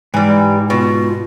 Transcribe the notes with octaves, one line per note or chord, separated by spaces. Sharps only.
G#2 E3 G3
B2 F4